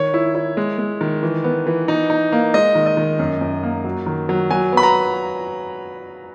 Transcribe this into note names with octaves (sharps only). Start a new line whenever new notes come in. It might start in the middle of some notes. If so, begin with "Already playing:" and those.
Already playing: D#3 C#5
E4
E4
G#3
G#3
D#3
E3
B3
E3
D#4
D#4
A#3
G#3 D#5
D#3
D#5
D#3
F#2
F#2
A#3
F#3
D#3
F#3
F#3 G#5
B3 B5
A#5